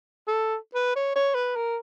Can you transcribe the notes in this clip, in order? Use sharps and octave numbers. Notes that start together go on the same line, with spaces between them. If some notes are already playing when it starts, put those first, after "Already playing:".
A4
B4
C#5
C#5
B4
A#4